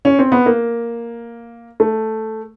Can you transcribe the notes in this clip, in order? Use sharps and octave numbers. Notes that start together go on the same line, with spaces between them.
C#4
C4
B3
A#3
A3